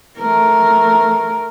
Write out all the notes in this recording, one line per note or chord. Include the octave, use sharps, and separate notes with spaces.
A3 A#4